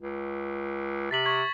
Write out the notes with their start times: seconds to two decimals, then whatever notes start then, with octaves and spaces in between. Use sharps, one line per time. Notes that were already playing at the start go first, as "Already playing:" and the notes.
0.02 C#2
1.11 C3 A6 B6 F#7
1.25 C#6 G#6 B6